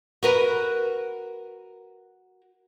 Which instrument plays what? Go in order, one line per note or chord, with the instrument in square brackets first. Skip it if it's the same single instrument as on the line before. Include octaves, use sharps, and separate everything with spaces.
[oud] F#4 A#4 B4